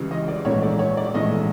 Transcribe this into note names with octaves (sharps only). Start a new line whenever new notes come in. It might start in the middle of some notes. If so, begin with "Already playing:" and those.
Already playing: C#2 C#3 E3 G3
D#5
D5
A#1 G#2 E3 A3 C#5
D5
C#5
D5
A#1 G#2 E3 A3 D#5